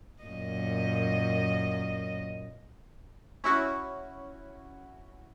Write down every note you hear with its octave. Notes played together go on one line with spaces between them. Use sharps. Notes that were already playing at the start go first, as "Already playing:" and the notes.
F#2 A#2 D#5
C#4 E4 F#4